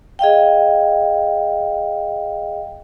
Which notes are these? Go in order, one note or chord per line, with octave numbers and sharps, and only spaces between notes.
G#4 D#5 F5 G5